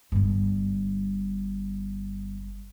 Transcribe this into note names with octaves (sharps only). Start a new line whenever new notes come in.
G1 G3